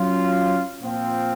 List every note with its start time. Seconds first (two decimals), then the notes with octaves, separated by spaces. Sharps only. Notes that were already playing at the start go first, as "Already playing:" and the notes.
Already playing: F#3 C#4 F4
0.81 A#2 F3 C4